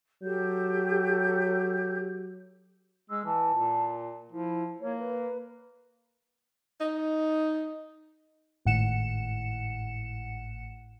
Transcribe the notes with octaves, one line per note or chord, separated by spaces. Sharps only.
F#3 G4 A4 G6
G#3 E6
E3 A5
A#2
F3 E4
A#3 C#5
B4
D#4
G#1 A2 F#5 C#7 E7